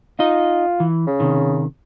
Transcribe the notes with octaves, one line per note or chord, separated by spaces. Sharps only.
D#4 F4 D#5
E3
C#3
C3 D#3